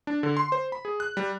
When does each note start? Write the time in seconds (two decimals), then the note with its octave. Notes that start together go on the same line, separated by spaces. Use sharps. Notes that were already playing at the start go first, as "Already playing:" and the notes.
0.07 D4
0.23 D3
0.37 C6
0.52 C5
0.72 B5
0.85 G#4
1.00 F#6
1.17 G3